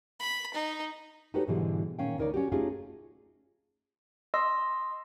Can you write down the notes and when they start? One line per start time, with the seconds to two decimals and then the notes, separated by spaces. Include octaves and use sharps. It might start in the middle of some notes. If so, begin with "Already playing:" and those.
0.20 B5
0.54 D#4
1.34 D#4 F#4 G4 A4 B4 C#5
1.47 G#2 B2 D3 E3 G3 G#3
1.99 A#2 D#3 C#4 F5 G5
2.18 D2 D#4 A#4 C#5 D5
2.34 C#4 F#4 G4
2.52 A3 C#4 D#4 F4 G4 G#4
4.34 D#5 C6 E6